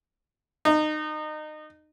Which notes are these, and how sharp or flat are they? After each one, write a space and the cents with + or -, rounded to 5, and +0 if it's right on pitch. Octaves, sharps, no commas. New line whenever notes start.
D#4 -25